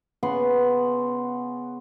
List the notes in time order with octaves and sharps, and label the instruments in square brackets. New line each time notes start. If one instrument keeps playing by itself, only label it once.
[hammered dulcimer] C#3 B3 F#5 C6